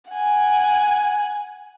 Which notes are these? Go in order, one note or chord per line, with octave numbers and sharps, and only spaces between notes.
F#5 G#5